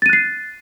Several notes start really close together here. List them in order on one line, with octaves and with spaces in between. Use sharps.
A6 D#7 F#6 C7